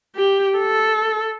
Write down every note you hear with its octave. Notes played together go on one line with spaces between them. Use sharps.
G4
A4